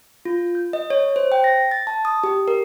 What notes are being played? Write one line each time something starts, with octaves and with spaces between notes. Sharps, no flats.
F4
G6
D#5
C#5
C5
G5
A#6
A6
A5
D#6
G4
A#4